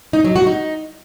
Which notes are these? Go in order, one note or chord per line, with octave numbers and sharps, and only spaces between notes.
D#4
F#3
F#4
D#4